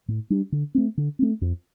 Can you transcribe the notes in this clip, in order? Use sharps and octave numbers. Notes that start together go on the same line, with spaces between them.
A2
G3 D4
D3
A3 C4
D3
A3 C4
F2